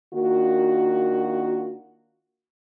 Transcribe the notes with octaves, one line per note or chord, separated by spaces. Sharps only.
D#3 A#3 D4 F4 F#4